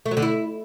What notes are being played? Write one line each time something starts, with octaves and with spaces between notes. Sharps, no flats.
A3
F#3
D3
E4